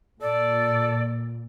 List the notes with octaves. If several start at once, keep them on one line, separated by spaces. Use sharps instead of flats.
A#2 A4 D5